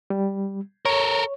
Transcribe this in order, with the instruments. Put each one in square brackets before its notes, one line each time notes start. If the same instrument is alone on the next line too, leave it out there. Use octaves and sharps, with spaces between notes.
[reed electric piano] G3
[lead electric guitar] A4 A#4 [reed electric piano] C#5